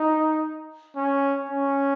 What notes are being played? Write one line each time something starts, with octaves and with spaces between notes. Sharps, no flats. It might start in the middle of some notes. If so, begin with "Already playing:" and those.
Already playing: D#4
C#4
C#4